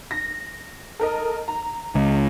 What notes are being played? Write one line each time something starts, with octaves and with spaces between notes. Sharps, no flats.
A#6
A4 A#4 D#5
A#5
C#2